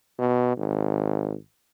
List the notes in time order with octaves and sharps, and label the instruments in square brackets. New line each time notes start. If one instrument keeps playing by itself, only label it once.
[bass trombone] B2
G#1